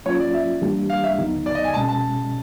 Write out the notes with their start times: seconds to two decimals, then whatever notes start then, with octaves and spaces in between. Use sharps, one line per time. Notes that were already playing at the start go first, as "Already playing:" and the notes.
0.05 F#3 A#3 C#4 F4 C#5
0.20 D5
0.34 E5
0.61 E3 G3 A#3 D4 G4
0.90 F5
1.04 E5
1.18 D2 D3 F#3 B3 D#4
1.46 D5
1.55 D#5
1.64 G#5
1.74 B2 G#3 C#4 A5
1.88 A5